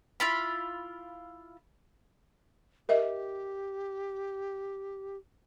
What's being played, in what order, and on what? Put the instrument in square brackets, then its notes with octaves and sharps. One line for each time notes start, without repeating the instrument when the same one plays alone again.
[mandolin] E4 F4 B5
[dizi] G4 [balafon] A#4 D#5 E5